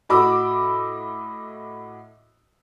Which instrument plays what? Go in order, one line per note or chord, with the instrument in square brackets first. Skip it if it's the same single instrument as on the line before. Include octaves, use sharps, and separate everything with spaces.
[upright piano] A2 F#4 D#5 B5 D6 E6